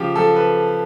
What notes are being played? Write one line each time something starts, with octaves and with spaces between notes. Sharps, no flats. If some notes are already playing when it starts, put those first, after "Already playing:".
Already playing: C#3 F3 G4
F3 A4
B4